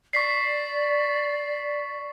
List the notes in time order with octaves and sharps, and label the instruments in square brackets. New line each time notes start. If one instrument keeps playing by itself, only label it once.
[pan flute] D5 [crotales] C#6 B6 C7